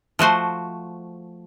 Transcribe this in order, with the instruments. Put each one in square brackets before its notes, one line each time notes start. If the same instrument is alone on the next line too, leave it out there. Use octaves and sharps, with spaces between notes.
[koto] F3 A3 F#4 C5